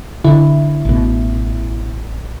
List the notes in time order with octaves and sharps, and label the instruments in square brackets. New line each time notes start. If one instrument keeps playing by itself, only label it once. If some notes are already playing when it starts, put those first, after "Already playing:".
[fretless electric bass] D3 [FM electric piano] E4
[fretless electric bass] A1 B2